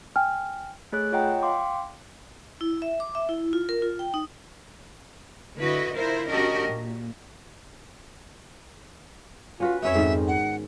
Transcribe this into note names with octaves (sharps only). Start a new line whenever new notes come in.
G5 G#5 F6
A3 G#4 C#5 F#6
F4 C#5 D#5 F#5 G5 A#5
F5 G5 C6 D6
E4
E5
D6
E5
E4
F4
A#4
F4
G5
D#4
D3 E4 F#4 B4 D#5
E4 F4 A#4 C5
C#4 D4 F#4 G4 A#4 D#5
A#2
C#4 F4 F#4 B4
F2 B3 C#4 C#5 E5
G#2 D#3
F#5